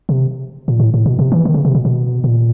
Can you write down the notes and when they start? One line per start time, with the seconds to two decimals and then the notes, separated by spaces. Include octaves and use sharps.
0.09 C3
0.68 A#2
0.80 A2
0.94 A2
1.06 B2
1.19 C3
1.32 E3
1.45 D#3
1.55 C#3
1.65 C3
1.75 B2
1.85 B2
2.24 A#2